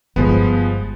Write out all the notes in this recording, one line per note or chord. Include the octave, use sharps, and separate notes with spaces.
G1 F3 G#3 B3